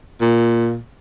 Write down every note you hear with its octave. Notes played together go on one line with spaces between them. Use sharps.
A#2